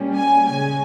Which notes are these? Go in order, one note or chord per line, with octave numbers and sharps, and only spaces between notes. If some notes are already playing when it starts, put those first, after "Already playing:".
Already playing: A#2 G3 C#4
G#5
C#3 G#3 C#4 G#5